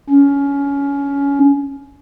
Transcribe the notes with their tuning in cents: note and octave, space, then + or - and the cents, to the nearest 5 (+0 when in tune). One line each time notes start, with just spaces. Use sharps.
C#4 +20